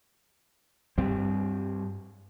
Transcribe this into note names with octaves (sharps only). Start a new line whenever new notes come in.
G2 G3 C4